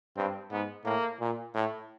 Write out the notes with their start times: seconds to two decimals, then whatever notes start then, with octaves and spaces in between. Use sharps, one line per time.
0.17 G2 C4
0.51 G#2 B3
0.85 A2 A#3
1.20 A#2
1.54 A2